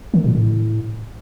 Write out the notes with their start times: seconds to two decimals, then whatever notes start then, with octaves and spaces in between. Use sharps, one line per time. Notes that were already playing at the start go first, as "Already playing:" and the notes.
0.14 D#3
0.24 A#2
0.35 A2